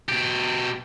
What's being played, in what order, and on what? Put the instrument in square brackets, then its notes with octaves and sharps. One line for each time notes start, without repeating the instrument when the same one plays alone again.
[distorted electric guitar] B2 G4